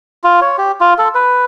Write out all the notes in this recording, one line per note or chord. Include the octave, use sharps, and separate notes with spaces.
F4
C#5
G4
F4
A4
B4